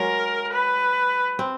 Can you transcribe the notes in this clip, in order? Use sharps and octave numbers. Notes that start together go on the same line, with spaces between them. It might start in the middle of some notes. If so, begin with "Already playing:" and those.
Already playing: F#3 G#3 A#4
B4
C4